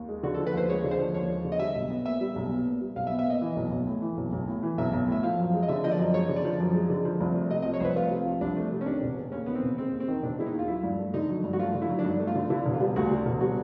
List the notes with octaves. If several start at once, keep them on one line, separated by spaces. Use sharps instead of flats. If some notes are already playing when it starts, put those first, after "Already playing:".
Already playing: D#2
G#3
D3 F#4
A4
F3
B4
D#2 C5
G#3 C#5
D3
C5
F3
D#2 C#5
G#3
D3
D#5
G3 E5
B1
B3
A#2 E5
G3
B1
B3
A#2
G3
B1 F5
E5
B3
E5
A#2 D#5
E3
B1
B1
A2
E3
B1
B1
A2
E3
B1 E5
B1
A2 E5
F3 F5
F#2
G#3
D#5
D3 E5
F3 D#5
D5
F#2
G#3 C#5
D3
D5
F3
F#2
G#3
D3
F3
C2
A3
C3 D#5
D#5
F3
C#5
C2 B4 C5
A3 F4
C3
F3
C2 D4
A3
C3
C#4
D#3 D4
E1
G#3
D#2 C#4
D#3 B3
C4
E1
G#3 C4
D#2
C4
D#3
E1 D4
G#3 E4
D#4
D#2
F4
F#3 E4
G2
A3
D3 D#4
F#3
G2
F#4
A3 F4
D3
E4
F#3
D4
G2 D#4
A3
F4
D3
D3 E4
E1
F4
G3
D2 F#4
D3
E1
G3 F#4